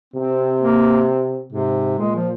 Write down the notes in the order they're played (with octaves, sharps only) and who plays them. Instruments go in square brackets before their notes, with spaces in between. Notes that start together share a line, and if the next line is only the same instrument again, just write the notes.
[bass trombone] C3 [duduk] C4
[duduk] A#3
[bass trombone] G#2 [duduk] C3
[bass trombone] A#2 [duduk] G#3
[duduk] F3